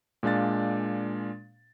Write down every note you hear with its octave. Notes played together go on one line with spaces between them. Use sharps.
A#2 G#3 D4 F5 A6